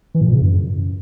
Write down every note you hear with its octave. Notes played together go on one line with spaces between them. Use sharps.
E3
A2
A#2
C#3
F#2